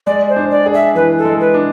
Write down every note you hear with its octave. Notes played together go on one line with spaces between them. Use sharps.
G#3 D5
C5
D4
D5
G#4
E5
E3 B4
A4
G#3
B4
D4